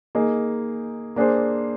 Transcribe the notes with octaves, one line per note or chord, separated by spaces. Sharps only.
A#3 D#4 G#4
A#3 D4 G#4 C5